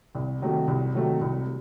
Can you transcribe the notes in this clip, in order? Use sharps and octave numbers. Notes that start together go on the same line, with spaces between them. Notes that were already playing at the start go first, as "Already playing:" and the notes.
C2
C3 D#3 F#3 A3
C2
C3 D#3 F#3 A3
C2